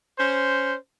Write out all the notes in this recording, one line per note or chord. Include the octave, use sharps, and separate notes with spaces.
C#4 C5